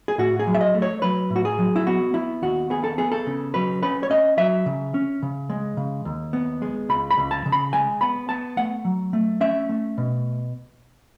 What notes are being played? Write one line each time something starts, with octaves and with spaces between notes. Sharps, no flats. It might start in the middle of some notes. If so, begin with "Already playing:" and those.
G#4
A2 F#4
G#4
F#3
E5
D#5
A3
C#5
F#3 B4
A2
F#4
G#4
F#3
E4
B3 F#4
B3 E4
D#2 F#4
B3 G#4
A4
B3 G#4
A4
C#3
F#3 B4
C#4 B4
C#5
C#4 D#5
F#3 E5
C#3
C#4
C#3
G#3
C#3
D#2
B3
G#3
C#2 B5
B5
C#2
A5
C#3
B5
G#3 G#5
B3 B5
B3 A5
A3 F#5
F#3
A3
C#4 E5
A3
B2